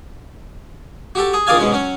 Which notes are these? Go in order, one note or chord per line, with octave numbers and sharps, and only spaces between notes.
F#4 G4 A4
G#4
A#1 D#3 G#4 D5 F5 G#5
G#2 B2 G#3 C#4
F#3 C#4